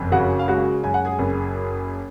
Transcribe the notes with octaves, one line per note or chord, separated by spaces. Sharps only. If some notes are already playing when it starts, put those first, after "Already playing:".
Already playing: F#1 F2
C#3 F#4 F#5
F5
G#3 F#4 F#5
F#2 G#5
F#5
G#4 G#5
F#1